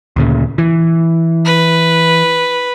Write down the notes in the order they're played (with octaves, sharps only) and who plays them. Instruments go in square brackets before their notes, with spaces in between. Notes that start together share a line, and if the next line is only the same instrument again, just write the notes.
[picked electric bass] D2 A#2 C#3
E3
[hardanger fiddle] B4